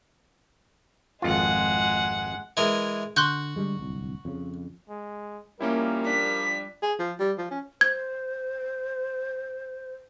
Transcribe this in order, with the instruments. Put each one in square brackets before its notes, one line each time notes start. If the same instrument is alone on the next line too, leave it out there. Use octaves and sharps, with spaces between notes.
[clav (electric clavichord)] G#1 F2 F4 [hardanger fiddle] G#3 F#5
[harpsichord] E3 G#3 A#4
[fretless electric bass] D3 [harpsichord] F#4 [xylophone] C6 F#6 G6
[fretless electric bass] D3 G3 G#3
D1 C2
F2 C#3
[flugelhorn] G#3
[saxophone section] F3 G3 [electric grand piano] A#3 C#4 E4 [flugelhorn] A#4
[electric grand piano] D4 [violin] B6
[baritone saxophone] G#4
F3
G3
F3
C#4
[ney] C5 [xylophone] G#6